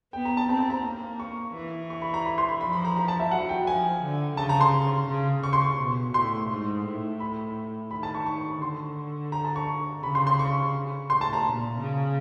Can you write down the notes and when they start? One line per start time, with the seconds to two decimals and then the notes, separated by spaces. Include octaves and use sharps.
0.13 B3 G5
0.25 A#5
0.37 A5
0.49 C4 A#5
0.59 A5
0.70 A#5
0.84 A#3
1.20 C#6
1.55 E3
1.90 C#6
2.02 B5
2.14 A#5
2.25 B5
2.38 C6
2.49 B5
2.61 F3 B5
2.73 B5
2.85 A#5
2.96 A#5
3.08 A5
3.20 E5
3.31 F#3 F#5
3.49 G5
3.67 F3 G#5
4.03 D3
4.37 C#3 A5
4.49 A#5
4.61 C6
5.09 C#3
5.43 C#3 C#6
5.53 C6
5.62 C#6
5.79 B2
6.14 A2 C6
6.50 G#2
6.85 A2
7.20 B5
7.91 D#3 B5
8.03 A5
8.14 C#6
8.26 C#6
8.62 D3 C6
9.32 A#5
9.45 A5
9.56 C#6
10.03 C#3 B5
10.15 C6
10.27 C6
10.39 C#6
11.10 A2 C6
11.21 A5
11.33 A#5
11.45 A#2
11.80 C#3